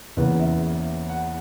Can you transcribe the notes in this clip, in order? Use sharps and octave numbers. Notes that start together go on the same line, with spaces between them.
E2 C#3 E3 A#3 B4
E5
F#5